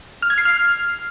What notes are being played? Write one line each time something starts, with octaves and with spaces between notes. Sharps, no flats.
F6
G#6
C7
F6